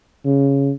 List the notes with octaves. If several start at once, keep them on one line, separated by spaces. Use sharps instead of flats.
C#3